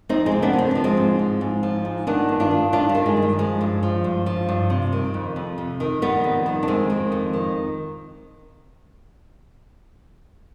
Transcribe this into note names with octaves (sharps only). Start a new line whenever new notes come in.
F2 C4 D#4
G#3 C4
C3
B3 D4
D#3
C4
F3 D4
G#3 C4
G#2
F3
G#2
F3
G#2
D#3 B3 D4
G2
D4 F4
D#3
G2 D4 F4
G3
D#3
G#3
G2
G3
F3 G#3
G2
F3
G2
F3
G2
C3
D#3
F2
F2
C3
D#3
D#3 G3 B3
F2
D#3
D4
F2 G#3 C4
D#3
F2
D#3